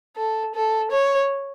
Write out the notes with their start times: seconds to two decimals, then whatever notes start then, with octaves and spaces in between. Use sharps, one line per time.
0.17 A4
0.55 A4
0.91 C#5